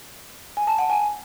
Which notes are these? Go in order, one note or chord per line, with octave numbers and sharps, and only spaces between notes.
G#5
A5
F#5
G#5